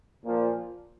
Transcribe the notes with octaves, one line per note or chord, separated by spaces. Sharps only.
A#2 F3